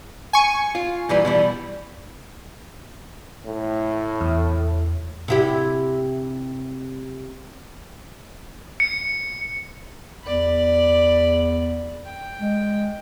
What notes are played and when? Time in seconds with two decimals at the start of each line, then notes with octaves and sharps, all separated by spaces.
0.33 G#5 C#6
0.75 F4
1.09 A#2 E3 G3
1.25 B2 E3 G3
3.46 A2
4.21 E2
5.28 C3 E4 G4
8.80 C#7
10.23 E2 D5 B5
12.05 G5
12.40 G#3